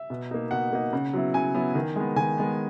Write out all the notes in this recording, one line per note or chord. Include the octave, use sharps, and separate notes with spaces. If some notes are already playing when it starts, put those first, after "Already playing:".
Already playing: E5
B2
A#3 D#4
B2 F#5
A#3 D#4
C#3
F#3 B3 E4
C#3 G#5
F#3 B3 E4
D#3
G#3 B3
D#3 G#5
G#3 B3